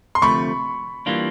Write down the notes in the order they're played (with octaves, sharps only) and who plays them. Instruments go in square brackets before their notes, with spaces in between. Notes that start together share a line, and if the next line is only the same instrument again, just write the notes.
[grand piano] C6
[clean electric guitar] D2 C3 F3 A3 [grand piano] B5 C#6
[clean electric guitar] E3 G3 A#3 D4 F4